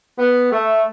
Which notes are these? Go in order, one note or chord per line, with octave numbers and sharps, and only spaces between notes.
B3
A3